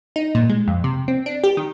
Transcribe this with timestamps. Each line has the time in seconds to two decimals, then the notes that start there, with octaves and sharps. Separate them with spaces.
0.16 D#4
0.35 A#2
0.50 G#3
0.68 F2
0.84 C3
1.08 C4
1.26 D4
1.44 G4
1.57 D#3